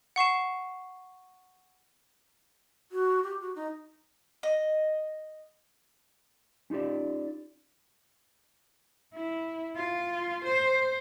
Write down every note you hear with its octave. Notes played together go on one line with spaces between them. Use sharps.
F#5 C#6 C7 E7
F#4
G4
F#4
D#4
D#5
C#4 D#4 F4 G4 D5
E4
F4
C5